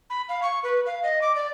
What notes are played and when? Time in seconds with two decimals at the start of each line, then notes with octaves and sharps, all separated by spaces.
0.10 B5
0.29 F5
0.42 C#6
0.63 B4
0.86 F5
1.03 D#5
1.22 D6
1.35 D5